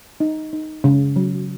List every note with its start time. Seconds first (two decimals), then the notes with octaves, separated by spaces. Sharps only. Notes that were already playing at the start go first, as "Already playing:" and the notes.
0.20 D#4
0.53 D#4
0.84 C#3
1.16 F#3